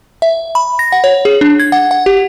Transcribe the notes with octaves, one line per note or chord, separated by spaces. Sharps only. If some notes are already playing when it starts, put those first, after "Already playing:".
E5
B5
A#6
F#5
C#5
G#4
D4
G#6
F#5
F#5
G4